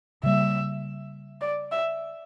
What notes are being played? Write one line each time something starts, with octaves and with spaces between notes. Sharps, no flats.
C#3 G3 A#3 E5
D5
E5